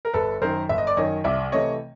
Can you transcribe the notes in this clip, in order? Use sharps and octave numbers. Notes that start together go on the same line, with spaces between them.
A#4
G1 A4 B4
F#2 D#3 A#4 C5
G1 E5
D#5
D5
F#2 D#3 C#5 D#5
C2 D5 E5
C3 E3 A3 C#5 D#5